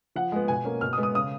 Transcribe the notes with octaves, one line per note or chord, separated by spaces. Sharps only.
F3 F#5
G#3 B3
B2 G#5
A#3 C#4
B2 F6
D#6
G#3 B3
D#6
C#3 D#6